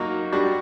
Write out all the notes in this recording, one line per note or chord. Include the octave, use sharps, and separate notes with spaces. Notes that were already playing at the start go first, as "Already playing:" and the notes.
Already playing: F#3 A#3 D#4 F#4
G3 D4 F#4